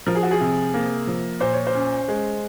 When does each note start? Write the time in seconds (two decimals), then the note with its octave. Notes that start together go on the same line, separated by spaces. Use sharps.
0.07 F3 A#4
0.15 G#4
0.23 F#4
0.31 G#4
0.41 C3
0.74 A#3
1.07 F3
1.40 A#2 C5
1.53 C#5
1.67 C5
1.75 C#4
2.08 G#3